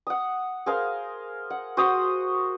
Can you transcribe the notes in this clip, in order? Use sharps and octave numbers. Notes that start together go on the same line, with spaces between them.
F#5 D#6
G#4 A#4 C5 F5
F#5
F#4 C5 C6 D#6